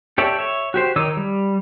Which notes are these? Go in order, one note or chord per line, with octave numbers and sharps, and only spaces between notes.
G4 A4 C#5 D5 E5
C#5 E5
F#4 G4 C5
D#3 D#4 C#5 D6 E6
G3